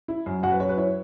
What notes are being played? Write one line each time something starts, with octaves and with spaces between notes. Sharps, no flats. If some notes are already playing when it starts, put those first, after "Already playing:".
E4
F#2
F#2 F#4 F#5
B4
F#3 C#5
B4
E4 C#5